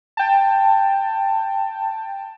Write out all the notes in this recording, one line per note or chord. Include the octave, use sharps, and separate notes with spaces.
G5 A5